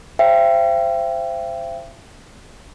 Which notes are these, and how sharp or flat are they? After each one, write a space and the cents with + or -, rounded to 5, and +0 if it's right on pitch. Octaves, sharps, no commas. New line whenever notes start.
C5 +0 E5 +40 G5 +0